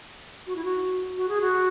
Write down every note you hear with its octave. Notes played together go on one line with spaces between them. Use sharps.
F#4
E4
F#4
F#4
G#4
F#4